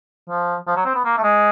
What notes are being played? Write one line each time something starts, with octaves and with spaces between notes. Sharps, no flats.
F3
F3
F#3
C4
B3
A#3
A3
G#3